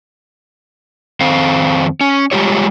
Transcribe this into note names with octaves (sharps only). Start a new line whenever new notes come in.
F2 D#3 C4 C5 F5
C#4
G3 G#3 F4 G4 C#5